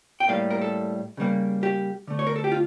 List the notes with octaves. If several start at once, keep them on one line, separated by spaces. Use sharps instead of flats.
G5
A2 G3 A#3 F5
A#4
A4
C#3 G3 A#3
G4
D3 A3
C#5
A#4
A4
G4
F4